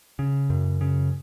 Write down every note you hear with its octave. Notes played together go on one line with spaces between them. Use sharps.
C#3
F#2
C#3